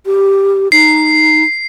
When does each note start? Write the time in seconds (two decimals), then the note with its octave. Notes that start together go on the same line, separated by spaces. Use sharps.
0.06 G4
0.72 D#4 C7